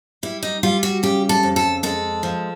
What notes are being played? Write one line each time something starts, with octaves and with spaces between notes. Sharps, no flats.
G3 E4
D#4
G3 F4
F#4
C#3 G4
A4
F2
A4
G#3 A4
F3